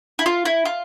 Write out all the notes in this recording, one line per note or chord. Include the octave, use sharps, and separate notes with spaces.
E4
F4
E4
F4